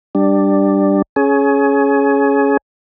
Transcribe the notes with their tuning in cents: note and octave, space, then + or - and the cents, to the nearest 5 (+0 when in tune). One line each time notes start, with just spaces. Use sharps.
G3 +0 D4 +10
C#4 +0 G#4 +25